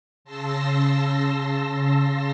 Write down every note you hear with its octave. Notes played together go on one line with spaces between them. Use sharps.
C#3 A5 C6 E6 A#6